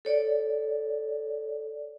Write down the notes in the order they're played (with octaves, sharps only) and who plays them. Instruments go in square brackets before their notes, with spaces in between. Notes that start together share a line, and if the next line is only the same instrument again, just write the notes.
[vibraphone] A4 C#5 D5